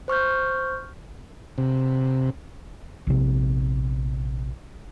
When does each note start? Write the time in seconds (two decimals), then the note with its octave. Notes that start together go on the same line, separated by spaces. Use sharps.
0.08 C5 C#6 F6 G6
1.58 C3
3.07 A#1 C3